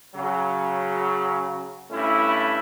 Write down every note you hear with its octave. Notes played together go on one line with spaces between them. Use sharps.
C#3 F#3
G2 A3 C#4 E4